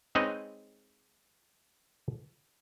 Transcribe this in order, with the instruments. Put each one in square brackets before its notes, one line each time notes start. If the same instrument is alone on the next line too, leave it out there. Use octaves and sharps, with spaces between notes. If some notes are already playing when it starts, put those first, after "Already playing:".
[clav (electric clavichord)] G#3 C4 D#4 B4 C#5 D#5